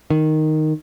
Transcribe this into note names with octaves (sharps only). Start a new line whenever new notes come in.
D#3